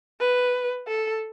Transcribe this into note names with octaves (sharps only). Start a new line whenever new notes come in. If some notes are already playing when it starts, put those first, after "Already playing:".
B4
A4